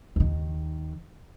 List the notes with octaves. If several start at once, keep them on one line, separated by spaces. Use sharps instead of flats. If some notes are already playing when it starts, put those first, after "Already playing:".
D#2 D#3